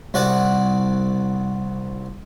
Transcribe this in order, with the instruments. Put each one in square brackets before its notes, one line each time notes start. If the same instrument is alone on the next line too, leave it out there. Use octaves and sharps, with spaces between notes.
[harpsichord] C2 F#4 D5 F#5